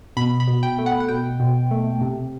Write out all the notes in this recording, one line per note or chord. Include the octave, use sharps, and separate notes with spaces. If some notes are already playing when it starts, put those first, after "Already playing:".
B2 B5
B5
B2
G5
A3
F#5
F#5
B2 G5
B2
A3
C3